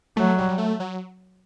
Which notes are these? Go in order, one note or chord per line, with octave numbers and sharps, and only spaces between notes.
F#3 A3
G3
A3
F#3